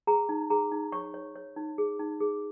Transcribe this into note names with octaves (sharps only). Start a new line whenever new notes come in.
G#4 A#5
D#4
G#4 A#5
D#4
C#5 C#6
C#5
C#5
D#4
G#4
D#4
G#4